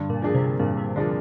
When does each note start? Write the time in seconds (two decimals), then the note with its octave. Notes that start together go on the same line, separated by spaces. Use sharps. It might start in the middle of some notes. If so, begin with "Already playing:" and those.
Already playing: G2 D3
0.10 A#2
0.22 F3 A#3 D4 G#4
0.35 C3
0.59 G2 A#2
0.77 C3
0.96 D3 F3 A#3 D4 G#4